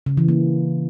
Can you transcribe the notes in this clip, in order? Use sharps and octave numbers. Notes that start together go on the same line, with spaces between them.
C#3
E3
A#3